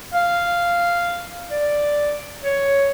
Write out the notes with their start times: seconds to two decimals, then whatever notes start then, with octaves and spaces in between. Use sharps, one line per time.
0.14 F5
1.50 D5
2.43 C#5